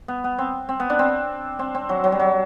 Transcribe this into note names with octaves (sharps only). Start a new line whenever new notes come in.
B3
B3
C4
C4
B3
D4
C4
C4
C4
F#3
F#3
G3
F#3